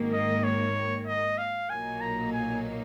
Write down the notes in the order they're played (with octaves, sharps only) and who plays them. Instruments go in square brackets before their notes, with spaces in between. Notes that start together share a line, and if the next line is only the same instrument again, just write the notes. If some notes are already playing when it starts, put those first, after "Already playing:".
Already playing: [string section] G#1 G#2 D#3 A#3
[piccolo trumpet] D#5
C#5
D#5
F5
[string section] B1 A#2 F#3 A#3 D#4 [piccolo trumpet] G#5
[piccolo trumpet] A#5
G#5